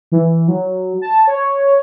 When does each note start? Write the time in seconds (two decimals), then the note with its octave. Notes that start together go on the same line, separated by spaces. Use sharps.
0.12 E3
0.48 F#3
1.02 A5
1.27 C#5